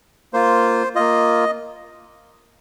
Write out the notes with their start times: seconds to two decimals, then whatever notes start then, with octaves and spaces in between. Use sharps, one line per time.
0.33 A#3 F4 C5
0.95 A#3 F4 D#5